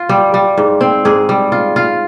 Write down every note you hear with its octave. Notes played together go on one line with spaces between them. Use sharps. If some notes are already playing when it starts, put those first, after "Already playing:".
Already playing: F4
G3
G3
G#2
C4
G#2 G#4
G3
F4
F4